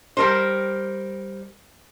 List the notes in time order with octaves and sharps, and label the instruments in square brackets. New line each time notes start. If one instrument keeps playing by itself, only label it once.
[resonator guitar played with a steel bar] G3 A#4 C5